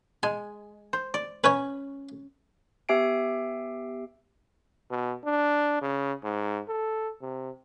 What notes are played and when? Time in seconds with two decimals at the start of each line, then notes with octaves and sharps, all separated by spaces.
0.23 G#3 G#5
0.93 C5
1.14 D5
1.44 C#4 B4 C#5 G#5
2.89 B3 G4 E5 G#5 C7 D7
4.90 B2
5.24 D4
5.82 C#3
6.23 G#2
6.68 A4
7.21 C3